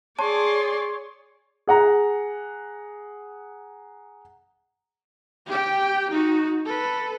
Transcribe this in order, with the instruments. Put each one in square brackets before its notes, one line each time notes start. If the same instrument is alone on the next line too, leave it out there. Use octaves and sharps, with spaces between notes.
[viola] G#4 D5 [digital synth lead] C#5 [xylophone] A5 [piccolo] C6
[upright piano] G#4 F#5 A#5
[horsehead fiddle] G4 G5
D#4 F#4
A4 B4